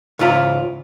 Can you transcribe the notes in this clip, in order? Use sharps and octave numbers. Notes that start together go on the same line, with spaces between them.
C#2 G#2 E3 F4 E5 A#5